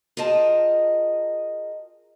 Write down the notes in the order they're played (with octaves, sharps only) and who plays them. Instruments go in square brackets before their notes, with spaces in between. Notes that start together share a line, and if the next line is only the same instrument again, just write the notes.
[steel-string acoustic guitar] F4 G#4 A#4 D#5 G5 A5